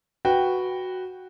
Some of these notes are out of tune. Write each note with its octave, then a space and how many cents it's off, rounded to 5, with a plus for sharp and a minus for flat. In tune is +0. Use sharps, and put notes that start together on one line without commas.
F#4 +0 B4 +0 G5 +0